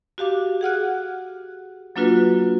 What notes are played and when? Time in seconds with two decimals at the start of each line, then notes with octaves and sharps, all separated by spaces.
0.18 F#4 G4 F5 D6
0.61 G#4 F#5 F6 F#6
1.96 F#3 A#3 D4 F4 F#4 B4